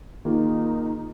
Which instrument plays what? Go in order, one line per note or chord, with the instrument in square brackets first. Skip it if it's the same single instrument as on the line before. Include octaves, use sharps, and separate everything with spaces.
[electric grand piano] D#3 A#3 F4 G#4 [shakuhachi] D#4